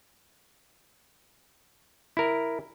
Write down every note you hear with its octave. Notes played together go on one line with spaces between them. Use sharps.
E4 A#4